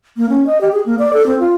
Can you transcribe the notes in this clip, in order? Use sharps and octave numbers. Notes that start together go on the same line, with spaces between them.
A#3
C#4
D#5
G4
G#4
A#3
D5
A4
C4
F4